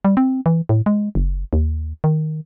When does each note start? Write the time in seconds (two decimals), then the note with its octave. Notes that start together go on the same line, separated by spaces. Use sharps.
0.05 G3
0.17 C4
0.46 E3
0.69 A2
0.86 G#3
1.15 F#1
1.53 D#2
2.04 D#3